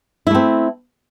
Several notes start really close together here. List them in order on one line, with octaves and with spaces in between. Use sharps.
E4 A3 C4